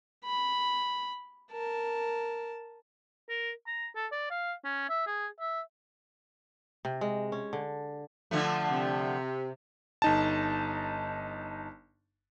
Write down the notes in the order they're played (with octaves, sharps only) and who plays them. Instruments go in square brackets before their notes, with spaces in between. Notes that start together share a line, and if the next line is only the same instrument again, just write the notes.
[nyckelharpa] B5
A#4 A5
[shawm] A#4
A#5
A4
D5
F5
C#4
E5
G#4
E5
[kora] C3
G#3
C#4
D3
[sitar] D3 F3 A3
[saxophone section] C3
[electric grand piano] G1 D#4 A5